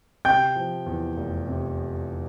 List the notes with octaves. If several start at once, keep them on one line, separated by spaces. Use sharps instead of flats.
C3 G5 G6
F3
E2
F1
C3